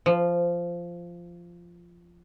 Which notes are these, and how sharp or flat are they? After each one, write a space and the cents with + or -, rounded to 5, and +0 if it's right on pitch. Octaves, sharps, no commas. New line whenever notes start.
F3 -10